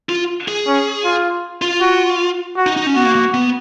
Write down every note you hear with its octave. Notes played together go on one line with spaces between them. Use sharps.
F4
G#4
C#4
F4
F4
F#4
F#4
D#4
D#4
C#4
B3 F#4
A#3
A#3
B3